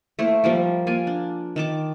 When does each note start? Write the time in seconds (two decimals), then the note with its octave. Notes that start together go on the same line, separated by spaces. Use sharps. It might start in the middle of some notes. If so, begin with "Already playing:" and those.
0.19 A3 A#3 E4 C5
0.44 F3 G3 A#3
0.87 A#3 F4 G#5
1.07 D4
1.56 D#3 A5 D6